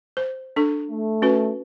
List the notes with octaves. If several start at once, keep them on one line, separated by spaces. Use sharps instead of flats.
C5
D4 A4 C#6
A3
C#4 F#4 B4